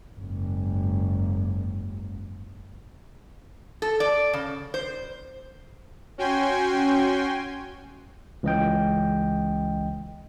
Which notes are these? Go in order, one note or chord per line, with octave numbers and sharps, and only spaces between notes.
F#1 G#2
A4
D5
C#3
C5
C#4 F#4 G5 G#5 C6
C#2 E3 D#5 G5